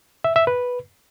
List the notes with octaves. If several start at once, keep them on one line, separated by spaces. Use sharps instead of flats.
E5
E5
B4